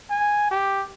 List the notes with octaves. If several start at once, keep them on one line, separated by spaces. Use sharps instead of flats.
G#5
G4